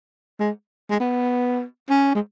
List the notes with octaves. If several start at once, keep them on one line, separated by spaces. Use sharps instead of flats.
G#3
G#3
B3
C#4
G#3